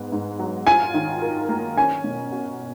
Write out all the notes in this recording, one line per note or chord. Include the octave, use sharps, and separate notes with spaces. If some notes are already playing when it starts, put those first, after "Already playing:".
Already playing: G#2 B3
G#2
F#3
F4 G#5
D#3
A#4
A#3
C#4 G#5
B2
F#4